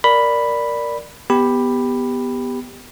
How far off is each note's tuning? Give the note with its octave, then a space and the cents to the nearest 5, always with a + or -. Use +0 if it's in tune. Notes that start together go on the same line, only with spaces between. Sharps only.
A#4 +0 D5 +0 B5 +0
B3 +0 G4 +10 B5 +0